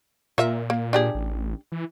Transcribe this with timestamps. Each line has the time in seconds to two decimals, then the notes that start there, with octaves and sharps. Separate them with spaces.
0.38 A#2 F4 A#4 E5
0.70 A#3
0.93 D4 G4 G#4
1.15 A1
1.72 E3